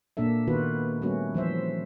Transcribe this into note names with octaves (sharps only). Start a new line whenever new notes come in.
A#2 A#3 D4 A4 E5
D#3 B3 F4 F#4 B4
G3 A3 B3 C#4 F#4
E3 F3 C5 E5